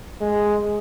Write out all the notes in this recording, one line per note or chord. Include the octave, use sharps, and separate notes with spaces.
G#3